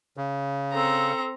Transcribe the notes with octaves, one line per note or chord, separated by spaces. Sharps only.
C#3
C4 A4 A#5